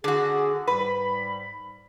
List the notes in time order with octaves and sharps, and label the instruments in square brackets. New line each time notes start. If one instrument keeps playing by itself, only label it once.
[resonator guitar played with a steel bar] D3 F#4 [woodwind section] G#4
[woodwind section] G#2 G3 B5 [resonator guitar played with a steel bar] B4